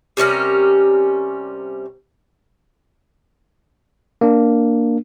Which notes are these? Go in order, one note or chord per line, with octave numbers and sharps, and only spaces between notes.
C3 G3 C#4 A#4
A#3 D4